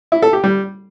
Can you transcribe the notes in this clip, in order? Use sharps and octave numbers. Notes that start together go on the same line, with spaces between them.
E4
A4
G4
G3